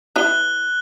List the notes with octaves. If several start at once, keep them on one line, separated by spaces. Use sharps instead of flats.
E4 B4 C#5 F#6 G7